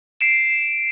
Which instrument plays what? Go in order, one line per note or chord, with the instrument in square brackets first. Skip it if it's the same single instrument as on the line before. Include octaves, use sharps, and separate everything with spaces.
[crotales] C7 D7 E7